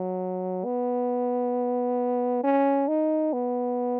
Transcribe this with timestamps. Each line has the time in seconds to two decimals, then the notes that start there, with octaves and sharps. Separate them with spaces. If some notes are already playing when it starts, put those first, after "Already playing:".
Already playing: F#3
0.65 B3
2.44 C#4
2.88 D#4
3.33 B3